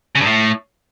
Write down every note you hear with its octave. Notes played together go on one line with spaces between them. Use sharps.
C#3
G2
A2